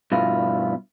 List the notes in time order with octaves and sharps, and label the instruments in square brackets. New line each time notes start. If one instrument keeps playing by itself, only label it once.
[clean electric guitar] G2 B2 E4 F4